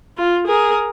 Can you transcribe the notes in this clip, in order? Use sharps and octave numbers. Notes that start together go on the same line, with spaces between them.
F4
G#4 A#4